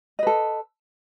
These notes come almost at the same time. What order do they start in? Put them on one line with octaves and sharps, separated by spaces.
D#5 B4 A4